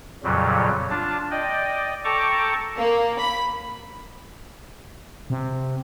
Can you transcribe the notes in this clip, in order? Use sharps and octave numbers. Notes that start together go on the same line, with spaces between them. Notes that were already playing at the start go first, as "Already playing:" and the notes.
F2 A#2 C#3 F#3 G3
D4 F4 A5
D5 D#5 G5
A4 G5 A5 A#5 C#6 D6
A#3
B5
C3